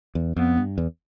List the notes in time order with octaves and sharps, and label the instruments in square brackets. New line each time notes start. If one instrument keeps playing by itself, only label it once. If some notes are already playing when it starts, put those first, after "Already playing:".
[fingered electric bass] E2
[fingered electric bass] F2 [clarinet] B3
[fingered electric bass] G2
E2